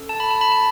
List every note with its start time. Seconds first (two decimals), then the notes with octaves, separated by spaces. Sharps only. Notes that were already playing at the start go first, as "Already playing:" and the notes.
Already playing: C#4 A4
0.09 A5
0.20 B5
0.31 A5
0.41 B5
0.52 A5